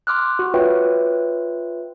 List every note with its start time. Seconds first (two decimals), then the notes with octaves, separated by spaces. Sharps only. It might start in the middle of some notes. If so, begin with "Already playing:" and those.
0.07 C6 D6 F6 F#6
0.39 F#4
0.54 F4 B4 C#5 E5 G5